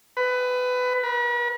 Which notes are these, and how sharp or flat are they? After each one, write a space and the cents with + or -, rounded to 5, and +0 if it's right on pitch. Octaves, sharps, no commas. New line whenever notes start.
B4 +20
B4 -45